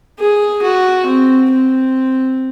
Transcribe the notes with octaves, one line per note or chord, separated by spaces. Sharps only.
G#4
F#4
C4
C4